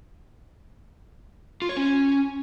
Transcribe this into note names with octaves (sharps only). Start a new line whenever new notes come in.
F4
C#5
C#4